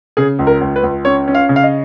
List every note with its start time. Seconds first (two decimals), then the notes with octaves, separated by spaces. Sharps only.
0.17 C#3 G#4
0.39 C#2
0.47 A#4
0.61 C#2
0.76 B4
0.83 C#2
1.05 C#4 C#5
1.28 C#4
1.35 F5
1.49 C#3
1.56 F5
1.63 D#5